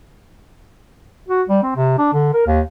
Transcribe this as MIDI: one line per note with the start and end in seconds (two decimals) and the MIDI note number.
1.28 1.42 66
1.49 1.58 55
1.63 1.75 60
1.76 1.94 48
1.98 2.11 62
2.13 2.32 50
2.33 2.46 70
2.47 2.61 39